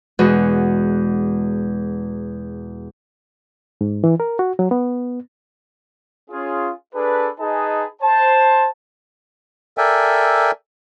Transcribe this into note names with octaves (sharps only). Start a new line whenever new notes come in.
E2 B2 G#3 F#4
G#2
E3
A#4
F#4
F#3
B3
C#4 F4 G#4
D4 G#4 A4 B4
D#4 G#4 B4 D#5 G#5 A5
C5 A5
A4 A#4 D5 E5 G5 G#5